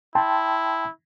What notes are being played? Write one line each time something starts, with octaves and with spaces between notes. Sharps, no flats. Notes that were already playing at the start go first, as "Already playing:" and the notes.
E4 G5 A5 C6